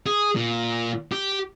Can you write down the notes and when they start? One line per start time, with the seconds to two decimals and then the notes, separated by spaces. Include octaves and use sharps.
0.06 G#4
0.35 A#2
1.12 G4